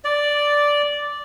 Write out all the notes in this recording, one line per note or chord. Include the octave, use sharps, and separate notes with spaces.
D5